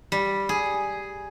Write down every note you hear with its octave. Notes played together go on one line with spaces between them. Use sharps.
G3
G#4